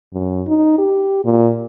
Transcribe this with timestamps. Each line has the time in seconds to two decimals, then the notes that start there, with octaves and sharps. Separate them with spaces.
0.13 F#2
0.47 D#4
0.78 G4
1.25 A#2